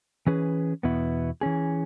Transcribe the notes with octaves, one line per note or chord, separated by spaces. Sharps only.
E3 C#4 G#4 B4
E2 B2 B3 E4
E3 C#4 G#4